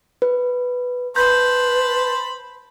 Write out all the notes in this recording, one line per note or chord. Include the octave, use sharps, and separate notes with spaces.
B4
B4 C5 A5 B5 G6